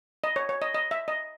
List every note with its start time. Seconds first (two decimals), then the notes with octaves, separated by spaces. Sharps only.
0.24 D#5
0.36 C#5
0.49 C#5
0.62 D#5
0.74 D#5
0.91 E5
1.08 D#5